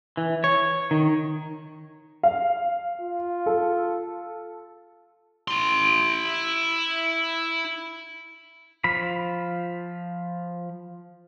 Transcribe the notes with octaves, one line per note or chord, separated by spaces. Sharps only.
E3
C#5
D#3
F5
F4
A4
E4 C6
F3 B5